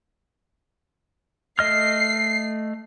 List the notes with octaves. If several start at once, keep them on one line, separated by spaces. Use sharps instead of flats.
A3 D#5 F6 C7